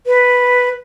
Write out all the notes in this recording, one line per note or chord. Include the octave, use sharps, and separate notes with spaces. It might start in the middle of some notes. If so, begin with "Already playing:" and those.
B4